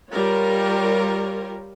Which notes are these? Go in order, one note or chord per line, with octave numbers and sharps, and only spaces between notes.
G3 F4 A#4 C#5